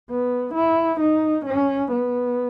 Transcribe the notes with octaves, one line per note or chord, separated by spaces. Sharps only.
B3
E4
D#4
C#4
B3